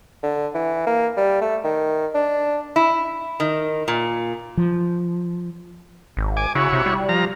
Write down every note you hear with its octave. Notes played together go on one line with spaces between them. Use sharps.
D3
E3
A#3
G3
A3
D#3
D4
E4
D#3
A#2
F3
G#1
G#5 D6
C#3 E4 F#4 C#5
C3
G3
F3 A#5